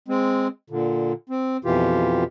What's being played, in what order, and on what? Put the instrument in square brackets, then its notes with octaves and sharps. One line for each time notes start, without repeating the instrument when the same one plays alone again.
[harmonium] G#3 C4
A#2 D3
C4
F2 B2 E3 F4 G4